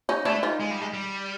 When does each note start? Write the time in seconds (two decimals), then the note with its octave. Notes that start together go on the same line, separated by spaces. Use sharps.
0.09 C#4 D#4
0.25 A3 D4 E4
0.43 D#4 F4
0.60 G#3
0.71 G3
0.81 G#3
0.94 G3